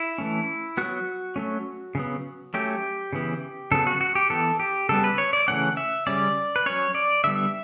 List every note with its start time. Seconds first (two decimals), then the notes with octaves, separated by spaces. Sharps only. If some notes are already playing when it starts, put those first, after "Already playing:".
Already playing: E4
0.18 E3 A3 C#4
0.77 F#3 B3 F#4
1.36 F#3 A3 C#4
1.95 C#3 F#3 B3
2.54 F#3 A3 C#4 G4
3.13 C#3 E3 B3
3.71 C#3 F#3 B3 A4
3.87 F#4
4.01 F#4
4.15 G4
4.30 E3 B3 A4
4.60 G4
4.89 C#3 G3 B3 A4
5.04 B4
5.18 C#5
5.33 D5
5.48 C#3 E3 A3 C#4 F#5
5.77 E5
6.07 C#3 G3 C#4 D5
6.56 B4
6.66 F#3 C#4 C#5
6.95 D5
7.24 D3 G3 B3 E5